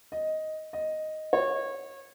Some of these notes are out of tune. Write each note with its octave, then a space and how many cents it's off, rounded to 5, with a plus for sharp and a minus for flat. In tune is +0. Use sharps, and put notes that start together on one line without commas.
D#5 +5
D#5 +0
C#5 -25